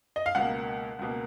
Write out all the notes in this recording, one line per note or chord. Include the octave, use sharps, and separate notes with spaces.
D#5
F5
C#2 B2 A#3 F#5
C#2 B2 A#3